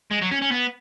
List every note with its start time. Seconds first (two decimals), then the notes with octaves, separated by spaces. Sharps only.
0.11 G#3
0.22 F#3
0.31 C#4
0.42 C#4
0.52 B3